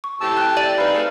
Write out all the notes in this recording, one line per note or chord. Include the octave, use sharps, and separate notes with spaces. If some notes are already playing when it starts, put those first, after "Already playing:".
C#6
A2 C3 G4 A5 E6
G5 F#6
D5 D#7
G#3 C4 D#4 B4 F5 B5
G#3 A3